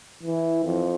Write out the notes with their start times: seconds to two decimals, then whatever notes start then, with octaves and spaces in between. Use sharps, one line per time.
0.23 E3
0.65 F2